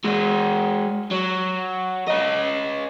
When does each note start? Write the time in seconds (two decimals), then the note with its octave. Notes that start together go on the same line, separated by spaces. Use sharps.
0.04 G#3 F#4
1.11 F#3
2.08 C#4 D#5